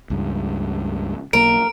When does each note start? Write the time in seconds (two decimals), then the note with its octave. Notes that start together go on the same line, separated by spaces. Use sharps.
0.10 C#2 G2
1.33 B1 A#3 A#4 D7